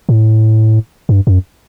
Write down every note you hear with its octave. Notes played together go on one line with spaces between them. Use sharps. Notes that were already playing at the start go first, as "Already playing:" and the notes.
A2
G2
F#2